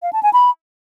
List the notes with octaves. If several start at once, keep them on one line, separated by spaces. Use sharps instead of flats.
F5
A5
G#5
B5